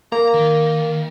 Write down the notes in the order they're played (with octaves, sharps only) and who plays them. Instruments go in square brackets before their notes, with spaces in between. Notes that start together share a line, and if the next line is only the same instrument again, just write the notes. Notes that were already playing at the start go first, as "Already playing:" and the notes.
[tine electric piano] A#3 [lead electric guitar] A#5
[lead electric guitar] D#3